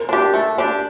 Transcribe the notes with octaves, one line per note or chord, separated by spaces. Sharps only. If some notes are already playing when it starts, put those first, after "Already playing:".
Already playing: A#4
D4 G4
A3
D4 G4